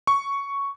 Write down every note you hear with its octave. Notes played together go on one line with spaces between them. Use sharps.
C#6